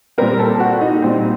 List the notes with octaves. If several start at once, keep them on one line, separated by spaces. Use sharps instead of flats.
A#2 G3 C4 A#4
A4
F#4
F#4
D#4
A#2 G3 C4